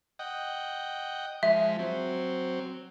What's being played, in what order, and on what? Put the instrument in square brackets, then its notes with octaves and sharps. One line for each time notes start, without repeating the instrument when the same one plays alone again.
[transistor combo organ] D#5 F#5 G5
[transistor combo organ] F3 G#3 [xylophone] E5
[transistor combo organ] F#3 C4